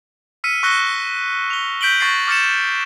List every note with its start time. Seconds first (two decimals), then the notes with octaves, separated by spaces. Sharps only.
0.44 E6 F6 B6 C#7 D#7
0.63 C#6 E6 F#6 A#6 C#7 G7
1.50 F7 G7
1.81 G6 B6 D7 F#7 G7
2.00 C#6 A6 A#6 C7
2.27 D6 F6 A6 C#7 E7